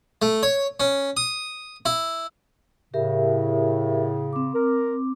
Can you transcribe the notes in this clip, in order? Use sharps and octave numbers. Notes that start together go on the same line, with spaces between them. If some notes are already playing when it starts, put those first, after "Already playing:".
A3
C#5
C#4
D#6
E4
A2 C#3 G4 A#4 E5
C4 D6
A#4